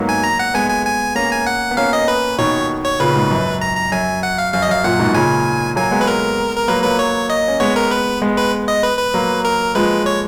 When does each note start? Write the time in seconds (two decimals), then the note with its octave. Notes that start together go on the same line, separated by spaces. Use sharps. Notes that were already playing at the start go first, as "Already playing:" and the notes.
Already playing: G#2 F#3 A#3 B3
0.09 G#5
0.24 A#5
0.39 F#5
0.54 G#3 B3 G#5
0.70 G#5
0.86 G#5
1.15 A#3 C#4 A#5
1.31 G#5
1.47 F#5
1.71 B3
1.77 A#3 C#4 F5
1.93 D#5
2.08 B4
2.38 B2 D#3 C#5
2.85 C#5
3.00 A#2 C#3 B4
3.16 G#2 B2
3.31 F#2
3.61 A#5
3.77 A#5
3.92 F#2 G#5
4.23 F#5
4.38 F5
4.53 F#2 F5
4.62 D#5
4.69 F#2 F5
4.84 F#2 A#2 F#5
4.99 G#2 B2
5.14 A#2 C#3 G#5
5.76 F#3 A#3 G#5
5.92 G#3 B3
6.01 B4
6.07 A#4
6.57 A#4
6.68 F#3 A#3 B4
6.84 F#3 A#3 B4
6.99 C#5
7.30 D#5
7.48 C#4
7.60 G#3 B3 C#5
7.76 A#4
7.91 B4
8.22 G#3 B3
8.38 B4
8.68 D#5
8.83 B4
8.99 B4
9.14 F#3 A#3
9.45 A#4
9.75 F3 G#3 B4
10.06 C#5